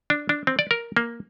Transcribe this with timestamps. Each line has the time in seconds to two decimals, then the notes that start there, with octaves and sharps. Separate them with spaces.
0.10 D4
0.29 D4
0.47 C4
0.59 D5
0.71 A#4
0.97 A#3